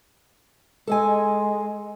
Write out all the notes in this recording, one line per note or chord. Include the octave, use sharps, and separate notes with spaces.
G#3 A4 D#5 G#5